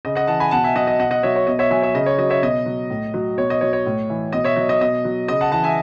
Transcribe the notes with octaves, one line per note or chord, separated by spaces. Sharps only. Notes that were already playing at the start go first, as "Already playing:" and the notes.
C#3 D#5
D#5 F#5
E3 F#5 A5
G#5 B5
B2 F#5 A5
E5 G#5
F#3 D#5 F#5
D#5
B2 D#5 F#5
D#5 F#5
F#3 C#5 E5
C#5
B2 D#5
C#5 E5
F#3 E5 G#5
C#5 E5
C#3 D#5
C#5
F#3 D#5
C#5 E5
B2 D#5
F#3
A2
F#3
B2 C#5
D#5
F#3 C#5
C#5
A2
E3
B2 D#5
C#5 E5
F#3 D#5
D#5
B2 D#5
F#3
C#3 D#5
F#5 A5
E3 F#5 A5
E5 G#5